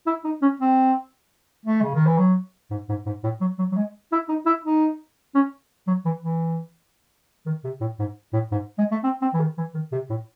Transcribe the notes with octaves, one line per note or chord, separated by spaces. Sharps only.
E4
D#4
C#4
C4
A3
C#3
D#3
E3
F#3
G#2
G#2
G#2
A2
F#3
F#3
F#3
G#3
E4
D#4
E4
D#4
C#4
F#3
E3
E3
D#3
C3
A2
G#2
A2
G#2
G#3
A3
C4
C4
E3
D#3
E3
D#3
C3
A2